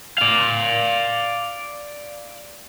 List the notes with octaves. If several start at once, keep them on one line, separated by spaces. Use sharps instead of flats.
D5 F5